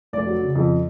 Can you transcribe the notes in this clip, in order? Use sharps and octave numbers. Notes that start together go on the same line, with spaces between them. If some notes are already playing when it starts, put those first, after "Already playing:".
F1 D5
F#3
C#3
F2